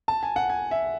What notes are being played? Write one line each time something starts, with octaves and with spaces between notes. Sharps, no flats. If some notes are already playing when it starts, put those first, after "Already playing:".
A5
G#5
F#5
G#5
E5